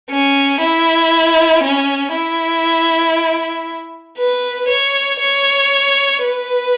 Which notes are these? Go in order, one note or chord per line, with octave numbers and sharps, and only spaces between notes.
C#4
E4
C#4
E4
B4
C#5
C#5
B4